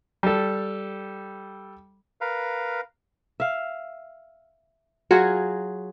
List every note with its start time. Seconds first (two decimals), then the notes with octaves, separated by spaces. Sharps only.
0.23 G3 A4
2.21 A#4 B4 F5
3.40 E5 F5
5.11 F#3 F4 F#4 G#4